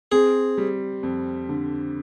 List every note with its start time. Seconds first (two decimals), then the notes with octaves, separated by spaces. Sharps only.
0.12 C4 G#4
0.58 G3
1.03 F2
1.49 D3